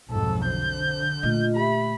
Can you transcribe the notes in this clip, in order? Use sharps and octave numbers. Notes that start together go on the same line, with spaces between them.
B1 F2 G#2 A4
D3 C5 G6
A#2 A3 F4 D#5
G4 E5 B5